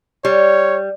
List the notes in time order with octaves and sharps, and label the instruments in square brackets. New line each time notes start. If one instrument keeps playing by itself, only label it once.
[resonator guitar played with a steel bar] G3 [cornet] C#5